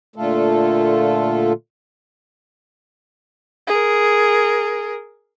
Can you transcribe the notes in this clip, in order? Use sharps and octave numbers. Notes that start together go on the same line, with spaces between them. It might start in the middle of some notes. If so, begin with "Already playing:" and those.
A#2 D3 A3 F4 A4
G#4 A#4